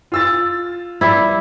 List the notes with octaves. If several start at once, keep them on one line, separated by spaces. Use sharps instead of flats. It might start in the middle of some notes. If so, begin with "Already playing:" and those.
F4 E6 A6
G3 E4